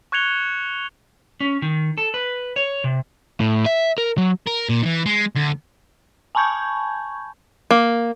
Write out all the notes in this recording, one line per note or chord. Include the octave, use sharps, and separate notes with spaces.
C#6 F#6 G#6 C#7 F7 G7
C#4
D#3
A4
B4
C#5
C3
A2
E5
A#4
F#3
A#4
A#2
D#3 E3
G#3
D2
G#5 A5 B5 C#6 G6 G#6
A#3